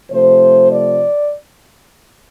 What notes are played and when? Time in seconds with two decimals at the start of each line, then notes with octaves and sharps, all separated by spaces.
0.11 C3 F3 A3 C5
0.71 D5